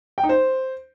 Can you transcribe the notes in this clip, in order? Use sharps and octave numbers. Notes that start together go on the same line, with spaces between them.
G5
D#4
C5